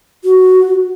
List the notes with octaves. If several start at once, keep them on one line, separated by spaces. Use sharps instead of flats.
F#4